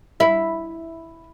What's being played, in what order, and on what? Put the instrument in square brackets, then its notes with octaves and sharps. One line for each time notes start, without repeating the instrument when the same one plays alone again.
[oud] E4